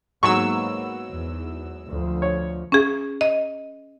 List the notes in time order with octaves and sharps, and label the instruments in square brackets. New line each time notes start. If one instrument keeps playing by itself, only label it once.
[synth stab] G#2 F#3 E6 [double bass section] A#3 B3 [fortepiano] C#6
[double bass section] E2
D2 F3
[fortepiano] C#5
[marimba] C#4 G#4
D#5